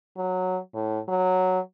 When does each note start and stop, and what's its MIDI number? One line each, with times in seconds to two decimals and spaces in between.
0.17 0.58 54
0.74 0.99 45
1.08 1.59 54